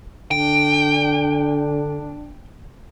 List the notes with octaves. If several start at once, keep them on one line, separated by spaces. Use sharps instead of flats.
D3 D4 G5